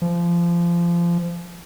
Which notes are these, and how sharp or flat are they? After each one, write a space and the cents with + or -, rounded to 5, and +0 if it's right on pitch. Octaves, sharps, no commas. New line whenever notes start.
F3 -25